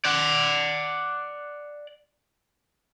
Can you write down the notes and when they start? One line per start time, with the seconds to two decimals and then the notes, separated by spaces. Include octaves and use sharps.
0.05 D5 F#5